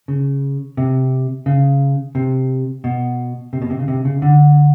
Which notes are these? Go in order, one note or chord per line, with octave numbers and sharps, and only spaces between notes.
C#3
C3
C#3
C3
B2
C3
B2
C3
C#3
C3
C#3
D3